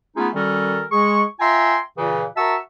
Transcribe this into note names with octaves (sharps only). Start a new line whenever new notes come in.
A3 B3 C#4 D#4 F4 G#4
D#3 G3 C#4 F#4 A4 A#4
G#3 G#4 C#6
F4 E5 G5 G#5 A#5 C6
A#2 C#3 E3
F#4 A#4 E5 A5 C#6 E6